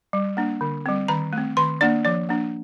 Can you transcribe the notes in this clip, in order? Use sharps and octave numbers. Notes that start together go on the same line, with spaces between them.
G3
A#3 D4
D3
G3 C4
D#3 A#5
A3 C4
D#3 C6
A#3 D4 D5
F3 D5
A#3 D4